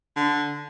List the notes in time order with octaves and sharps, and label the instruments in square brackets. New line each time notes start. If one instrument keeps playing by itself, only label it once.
[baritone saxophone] D3